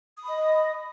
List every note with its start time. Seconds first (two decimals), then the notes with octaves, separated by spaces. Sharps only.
0.17 D#6
0.22 B5
0.27 D#5